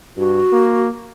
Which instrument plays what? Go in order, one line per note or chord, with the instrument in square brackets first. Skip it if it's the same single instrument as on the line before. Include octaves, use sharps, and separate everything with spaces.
[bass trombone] G2 [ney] F#4
[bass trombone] A#3